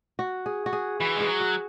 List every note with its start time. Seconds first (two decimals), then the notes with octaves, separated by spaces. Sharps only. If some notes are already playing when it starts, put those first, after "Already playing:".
0.19 F#4
0.46 G#4
0.66 F#4
0.73 G#4
1.00 E3 F#4
1.16 G#3 G#4
1.27 F#3
1.40 F#4